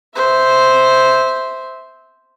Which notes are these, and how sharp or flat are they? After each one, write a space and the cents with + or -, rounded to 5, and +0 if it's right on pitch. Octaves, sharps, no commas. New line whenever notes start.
C5 -5 E5 -15